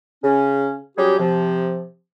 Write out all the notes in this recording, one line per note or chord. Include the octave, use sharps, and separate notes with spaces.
C#3 C#4
F#3 G3 C#4 G4 G#4
C3 F3